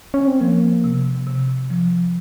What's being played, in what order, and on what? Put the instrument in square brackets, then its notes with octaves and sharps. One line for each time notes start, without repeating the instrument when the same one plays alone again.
[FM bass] C#4
C4
[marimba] F3 [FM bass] A#3
[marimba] C3
C3
F3